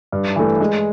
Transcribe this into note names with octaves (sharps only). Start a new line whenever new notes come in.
G2
E3 A3
G#3